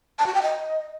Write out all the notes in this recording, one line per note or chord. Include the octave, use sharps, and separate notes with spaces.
A5
F#4
G5
D#5